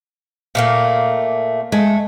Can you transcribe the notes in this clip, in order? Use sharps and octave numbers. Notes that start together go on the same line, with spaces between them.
A#2 A3 A#3
G#3 A3